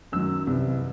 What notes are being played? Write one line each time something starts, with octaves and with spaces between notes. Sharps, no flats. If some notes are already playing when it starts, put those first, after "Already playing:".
F#2 D#3 F#3 E6
C2 C3 E3